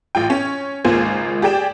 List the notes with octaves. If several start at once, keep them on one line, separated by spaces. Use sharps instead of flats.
A1 F4 G5
C#4
G#1 C#2 A#3 F4 C5 G#5
G4 G#4 D5 G5 E7